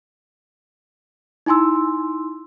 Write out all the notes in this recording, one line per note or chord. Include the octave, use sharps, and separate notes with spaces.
D#4 E4 G#5 C6 E6